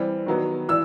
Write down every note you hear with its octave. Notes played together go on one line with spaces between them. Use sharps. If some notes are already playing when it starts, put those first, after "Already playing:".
Already playing: E3 G3 C4
D#3 F#3 B3
E3 E6